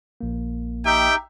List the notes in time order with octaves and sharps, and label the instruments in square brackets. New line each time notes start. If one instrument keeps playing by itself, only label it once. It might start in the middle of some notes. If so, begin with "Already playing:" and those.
[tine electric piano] A#1 A#3
[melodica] D#4 G4 E5 [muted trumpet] G5